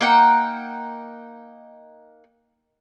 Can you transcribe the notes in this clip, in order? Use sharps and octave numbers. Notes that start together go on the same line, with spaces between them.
A#3 D#4 F#5 G5